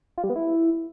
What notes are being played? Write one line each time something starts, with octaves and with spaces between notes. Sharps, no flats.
F4
G3
B3
E4